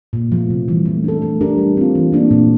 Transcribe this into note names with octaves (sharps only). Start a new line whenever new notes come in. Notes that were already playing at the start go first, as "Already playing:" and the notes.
A#2
F3 A3
C3
E3 G3
A3
D4 A4
A3
D4 G4 A#4
G3
C4 F4
E3
A#3 D4
A#2